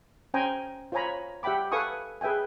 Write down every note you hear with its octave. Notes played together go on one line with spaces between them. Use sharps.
C#4 C5 G5 G#5 A#5
F4 C5 C#5 G#5 A#5 B5
G4 E5 F#5 G5 B5 D6
A4 B4 F5 G#5 C#6 D#6
G#4 B4 E5 G5 G#5